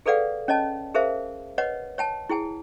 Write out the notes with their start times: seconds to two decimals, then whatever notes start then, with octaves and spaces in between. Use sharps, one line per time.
0.06 G#4 A4 B4 D5 F5 F#5
0.48 C#4 C#5 D#5 A5
0.94 G#4 A#4 C5 E5 F5
1.58 B4 C#5 D#5 F#5
1.98 C#5 G5 A5
2.29 E4 G#4 G5 G#5